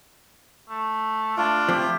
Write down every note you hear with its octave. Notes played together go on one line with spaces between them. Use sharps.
A3
A3 D4 F4
F3 C4 G4